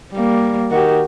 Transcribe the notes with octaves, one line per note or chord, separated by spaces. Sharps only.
G3 A#3
D#3 F#4 G4